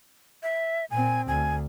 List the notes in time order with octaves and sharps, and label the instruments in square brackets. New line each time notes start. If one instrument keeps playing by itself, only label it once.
[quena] E5
[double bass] A#2 C4 [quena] G#5
[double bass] D2 [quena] G#5